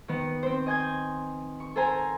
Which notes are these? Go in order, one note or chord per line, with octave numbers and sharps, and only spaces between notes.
D#3 B3
C4 C5
D#5 G#5 G6 G#6
C#6
A4 A#4 C5 G#5 A#5